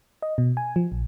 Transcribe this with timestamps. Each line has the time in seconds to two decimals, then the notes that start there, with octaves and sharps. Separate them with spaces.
0.22 D#5
0.38 B2
0.57 G#5
0.76 F3
0.92 A#1